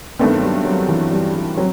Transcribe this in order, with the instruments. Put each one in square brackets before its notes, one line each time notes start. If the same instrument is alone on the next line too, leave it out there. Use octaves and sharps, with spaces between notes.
[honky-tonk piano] G2 D#3 A3 C4 [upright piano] B3
[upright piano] F#3
G3
F#3
E3
G3
G3
[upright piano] F#3 [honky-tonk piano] C4